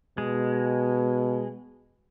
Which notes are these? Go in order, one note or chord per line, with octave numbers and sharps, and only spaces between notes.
B2 G#3